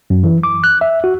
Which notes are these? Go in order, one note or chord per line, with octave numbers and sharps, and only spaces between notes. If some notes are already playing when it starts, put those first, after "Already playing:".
F#2
E3
D6
F#6
E5
F#4